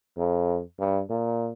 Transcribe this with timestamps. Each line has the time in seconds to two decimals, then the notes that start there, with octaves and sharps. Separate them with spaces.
0.17 F2
0.79 G2
1.10 A#2